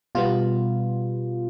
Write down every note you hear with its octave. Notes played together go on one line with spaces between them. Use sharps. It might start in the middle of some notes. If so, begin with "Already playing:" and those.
B2 G3 B3 F4